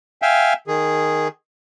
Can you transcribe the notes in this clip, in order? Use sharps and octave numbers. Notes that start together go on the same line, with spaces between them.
E5 F5 G5 G#5
D#3 G#4